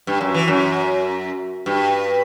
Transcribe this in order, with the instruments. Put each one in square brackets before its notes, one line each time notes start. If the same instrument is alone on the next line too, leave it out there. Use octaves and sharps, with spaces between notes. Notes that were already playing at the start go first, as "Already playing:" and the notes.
[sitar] G2
F#2
E3
F#2
G2